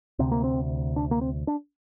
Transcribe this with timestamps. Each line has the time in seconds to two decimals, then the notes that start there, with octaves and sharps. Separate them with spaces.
0.19 D2 C3 C4
0.32 A#3
0.44 C4
0.96 D4
1.11 A#3
1.21 C4
1.47 D4